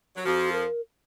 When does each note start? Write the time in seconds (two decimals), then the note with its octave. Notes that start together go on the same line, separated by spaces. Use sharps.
0.16 F#3
0.25 F2 F3 F#4
0.52 A#4